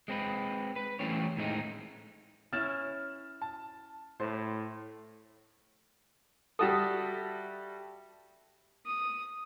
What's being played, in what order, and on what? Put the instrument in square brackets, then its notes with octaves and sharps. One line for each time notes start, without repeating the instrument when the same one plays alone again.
[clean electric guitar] G#3 C4 B4
B4
E3 G3 A3 C4 C#4 C#5
A2 D#3 G#3 A3 C4 D#4
[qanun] C#4 E4 B4 [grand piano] F6 A6 E7
[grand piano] A5
[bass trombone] A2 [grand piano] C5 [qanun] A5
[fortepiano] G3 F#4 A4 [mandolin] E5 A5 D#6
[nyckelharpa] D#6